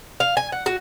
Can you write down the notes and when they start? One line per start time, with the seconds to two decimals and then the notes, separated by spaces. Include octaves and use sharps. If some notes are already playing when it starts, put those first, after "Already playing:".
0.20 F5
0.37 G#5
0.52 F#5
0.66 F#4